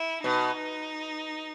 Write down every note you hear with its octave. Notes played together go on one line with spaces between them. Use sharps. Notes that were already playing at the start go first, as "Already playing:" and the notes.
Already playing: E4
B2 D#4